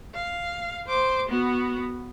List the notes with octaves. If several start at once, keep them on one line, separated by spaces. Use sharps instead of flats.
F5
C5 D6
B3 F#4